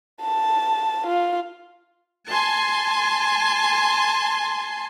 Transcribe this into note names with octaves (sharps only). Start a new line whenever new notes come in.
A5
F4
G#5 A5 C6